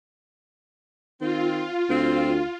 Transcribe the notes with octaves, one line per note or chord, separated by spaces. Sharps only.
D#3 C4 F4
D2 C4